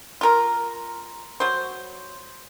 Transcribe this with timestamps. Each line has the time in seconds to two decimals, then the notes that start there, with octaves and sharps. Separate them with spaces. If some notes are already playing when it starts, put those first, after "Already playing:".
0.21 F4 A#4
1.40 F#3 C5